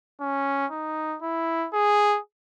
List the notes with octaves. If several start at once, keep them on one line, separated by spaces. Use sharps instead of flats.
C#4
D#4
E4
G#4